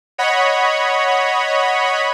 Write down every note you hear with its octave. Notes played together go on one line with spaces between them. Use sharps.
C#5 D#5 F#5 B5